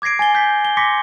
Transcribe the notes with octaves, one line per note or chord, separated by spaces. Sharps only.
D6 G#6 A#6 C7 D7
G#5 A6 G7
G6 B6
G7
C6 D6 A#6 B6 C#7